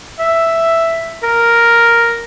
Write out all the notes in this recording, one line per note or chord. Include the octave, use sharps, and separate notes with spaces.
E5
A#4